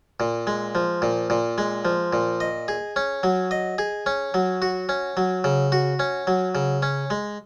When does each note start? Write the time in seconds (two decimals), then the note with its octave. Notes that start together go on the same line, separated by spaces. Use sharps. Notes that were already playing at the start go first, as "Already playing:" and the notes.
0.20 A#2
0.47 G#3
0.75 F3
1.02 A#2
1.30 A#2
1.58 G#3
1.85 F3
2.13 A#2
2.40 D#5
2.68 G#4
2.96 C#4
3.23 F#3
3.51 D#5
3.78 G#4
4.06 C#4
4.34 F#3
4.62 F#4
4.89 C#4
5.17 F#3
5.44 C#3
5.72 F#4
5.99 C#4
6.27 F#3
6.55 C#3
6.83 C#4
7.10 G#3